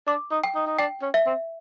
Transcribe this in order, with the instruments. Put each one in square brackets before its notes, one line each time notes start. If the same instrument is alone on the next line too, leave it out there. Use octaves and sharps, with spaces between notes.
[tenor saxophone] D4 [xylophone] D6
[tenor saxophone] D#4
[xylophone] G5
[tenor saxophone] D#4
D#4
[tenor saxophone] D4 [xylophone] G5
[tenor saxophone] C#4
[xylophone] E5
[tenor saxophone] C4